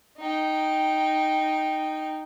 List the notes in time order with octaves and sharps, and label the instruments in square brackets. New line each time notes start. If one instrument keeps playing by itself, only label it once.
[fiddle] D#4 G5